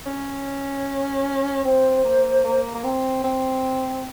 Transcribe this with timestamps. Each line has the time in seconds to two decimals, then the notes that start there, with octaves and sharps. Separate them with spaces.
0.06 C#4
1.64 C4 C5
2.04 A#3
2.44 A#3
2.75 A#3
2.84 C4
3.24 C4